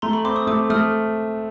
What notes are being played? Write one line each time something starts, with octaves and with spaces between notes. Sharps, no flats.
A3 A#5 C6
B5 C#6
C4 C6 D6
C#6 D#6
A3 D6 E6
A3 D#6 F6